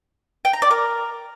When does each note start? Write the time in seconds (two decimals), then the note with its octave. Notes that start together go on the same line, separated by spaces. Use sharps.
0.45 G5
0.53 A#5
0.62 D5
0.71 A#4